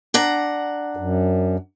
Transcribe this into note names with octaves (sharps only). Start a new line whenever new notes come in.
D4 F#5 A#5
F#2